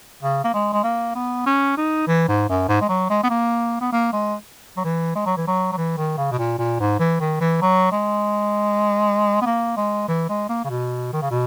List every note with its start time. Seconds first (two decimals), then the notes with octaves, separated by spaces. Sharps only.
0.23 C#3
0.44 A#3
0.54 G#3
0.73 G#3
0.84 A#3
1.15 B3
1.46 C#4
1.77 D#4
2.07 E3
2.28 G#2
2.49 F#2
2.68 G#2
2.81 G#3
2.89 F#3
3.10 G#3
3.23 B3
3.30 A#3
3.81 B3
3.92 A#3
4.13 G#3
4.77 F#3
4.84 E3
5.15 G#3
5.26 F#3
5.37 E3
5.47 F#3
5.72 F#3
5.77 E3
5.98 D#3
6.17 C#3
6.31 B2
6.38 A#2
6.58 A#2
6.80 G#2
6.99 E3
7.20 D#3
7.40 E3
7.61 F#3
7.92 G#3
9.42 B3
9.46 A#3
9.77 G#3
10.08 E3
10.29 G#3
10.49 A#3
10.65 C#3
10.69 B2
11.13 D#3
11.22 C#3
11.31 B2